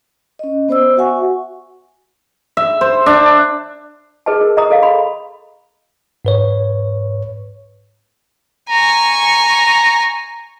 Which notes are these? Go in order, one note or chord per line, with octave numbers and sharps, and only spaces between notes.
C#4 D#5
B3 C5 D5 E6
F#4 E5 F#5 G#5 C#6
E5
C5
D4
G#4 B4 D#5 A5
A#4
D#5 A#5 D#6
A4 D#5 F5
B5
G#2 B4 C#5
G#5 A#5 C#6